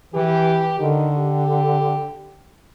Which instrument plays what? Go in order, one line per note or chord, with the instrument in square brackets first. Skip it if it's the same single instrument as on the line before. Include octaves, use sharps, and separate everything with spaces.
[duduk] E3 [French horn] G4
[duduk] D3 [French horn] D#3
[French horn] G4